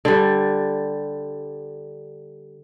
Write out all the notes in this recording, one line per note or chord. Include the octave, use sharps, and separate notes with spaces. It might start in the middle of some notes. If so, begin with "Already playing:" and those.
D3 G3